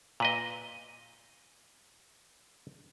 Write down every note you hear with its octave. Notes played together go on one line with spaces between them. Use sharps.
A#2 B4 D#5